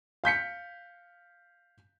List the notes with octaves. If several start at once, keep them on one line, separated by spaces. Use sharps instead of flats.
F5 G6 B6 C#7